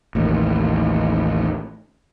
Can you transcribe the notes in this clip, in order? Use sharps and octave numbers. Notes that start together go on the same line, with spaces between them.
A1 D#2